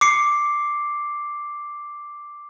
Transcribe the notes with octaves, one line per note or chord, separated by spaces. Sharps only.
D6 C7 C#7